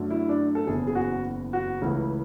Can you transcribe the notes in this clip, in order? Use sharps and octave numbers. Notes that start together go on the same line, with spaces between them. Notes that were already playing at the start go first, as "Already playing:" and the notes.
Already playing: F#2 D3 F#3 A3
E4
D4
A4
F#1 E2 C#3 G#4
G#4
F#4
F#4
C#2 C#3 E3 A3